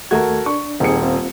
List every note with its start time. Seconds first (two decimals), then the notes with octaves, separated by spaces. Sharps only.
0.11 D#2 A3 F#4 A4 A#4 G#6
0.46 D4 C#6
0.80 D#1 C4 D#4 G#4 C#7
1.02 C4 F4